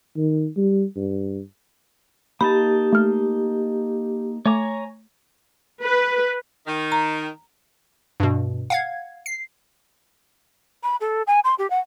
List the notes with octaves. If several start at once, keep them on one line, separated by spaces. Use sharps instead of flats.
D#3
G3
G2
A#3 D#4 G4 A5 B5
A3 F6
A3 C#5 G#5 A#5 D6
B4
D#3
A#5
G2 B2
F5 F#5 G#6
C7
B5
A4
G#5
C6
G4
F#5